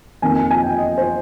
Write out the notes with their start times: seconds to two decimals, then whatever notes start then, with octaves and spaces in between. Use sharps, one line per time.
0.22 F2 D#3 A#3 G#5
0.36 G#5
0.51 G#5
0.63 G5
0.78 D#5
0.98 C5